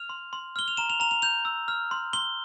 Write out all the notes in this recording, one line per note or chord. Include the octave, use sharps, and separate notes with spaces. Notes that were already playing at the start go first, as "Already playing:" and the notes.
Already playing: F6 F7
C6
C6
F6 G7
F7
A#5 E7
F7
A#5 F7
F7
G6 F7
E6
F6
C6
C6 G7